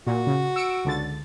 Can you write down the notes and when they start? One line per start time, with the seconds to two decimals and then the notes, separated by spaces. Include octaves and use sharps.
0.07 A#2 F#4
0.27 C#3
0.56 E6 C#7 D7
0.85 C#2 D3 A6